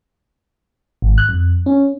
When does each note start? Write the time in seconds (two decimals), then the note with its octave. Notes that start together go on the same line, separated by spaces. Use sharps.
1.02 G#1
1.18 F#6
1.29 F2
1.66 C#4